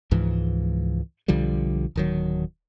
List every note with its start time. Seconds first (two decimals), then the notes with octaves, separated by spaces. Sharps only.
0.11 C#2 G#2 E3 F3
1.28 B1 D3 F3 G3
1.96 D1 D#3 F#3